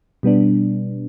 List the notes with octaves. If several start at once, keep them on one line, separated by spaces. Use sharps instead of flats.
B2 G3 B3 D4